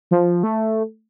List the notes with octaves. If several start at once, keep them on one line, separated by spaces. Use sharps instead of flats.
F3
A3